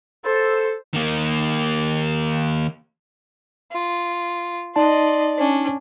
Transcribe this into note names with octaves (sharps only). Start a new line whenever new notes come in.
A4 C5
D#3 A#3
F4
D#4 D5 D#5 A5 C6
C#4 D4